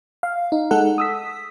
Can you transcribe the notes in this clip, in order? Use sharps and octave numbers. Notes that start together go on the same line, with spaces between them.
F5
D#4
G#3 D#4 A4 F#5
D#6 E6 B6